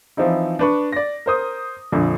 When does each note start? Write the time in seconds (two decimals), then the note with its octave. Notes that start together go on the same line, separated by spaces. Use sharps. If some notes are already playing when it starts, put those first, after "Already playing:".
0.17 E3 F3 C4 D#4 E4
0.59 D4 B4 C#6
0.93 D5 A#6
1.26 A#4 C5 D#6
1.92 A#1 F2 D3